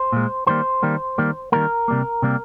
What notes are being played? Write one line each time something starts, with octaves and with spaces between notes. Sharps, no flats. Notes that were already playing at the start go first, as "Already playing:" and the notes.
Already playing: C5
A#2 G#3
D#3 G3 A#3 C5
D#3 G3 A#3
D#3 G3 A#3
D#3 G3 A#3 A#4
C3 G3 A#3
C3 G3 A#3